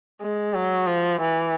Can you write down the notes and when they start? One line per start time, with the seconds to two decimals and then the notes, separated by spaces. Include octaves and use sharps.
0.21 G#3
0.54 F#3
0.87 F3
1.21 E3